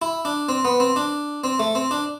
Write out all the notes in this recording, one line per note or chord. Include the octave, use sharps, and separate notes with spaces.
E4
D4
C4
B3
C4
D4
C4
A3
C4
D4